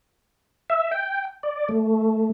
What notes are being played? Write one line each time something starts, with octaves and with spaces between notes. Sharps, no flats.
E5
G5
D5
A3